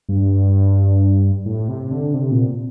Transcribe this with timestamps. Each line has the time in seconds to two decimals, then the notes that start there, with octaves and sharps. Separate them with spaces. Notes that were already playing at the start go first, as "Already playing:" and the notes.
0.09 G2
1.46 A2
1.68 C3
1.91 D3
2.14 C3
2.31 A#2